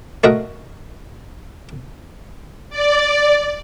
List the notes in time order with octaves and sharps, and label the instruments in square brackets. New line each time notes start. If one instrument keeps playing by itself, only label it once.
[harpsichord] A3 F#4 A#4 D#5 E5
[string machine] D5